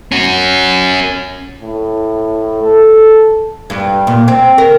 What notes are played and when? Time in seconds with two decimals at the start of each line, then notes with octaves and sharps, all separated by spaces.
0.12 C#4 F#4
1.60 A2
2.63 A4
3.70 G2
4.07 A#2
4.28 C4
4.58 A#4